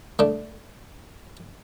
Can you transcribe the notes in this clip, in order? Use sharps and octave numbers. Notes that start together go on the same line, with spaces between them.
A3 D4